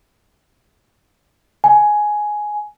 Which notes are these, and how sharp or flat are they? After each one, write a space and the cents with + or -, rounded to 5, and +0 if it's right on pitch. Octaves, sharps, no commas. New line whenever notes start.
G#5 +10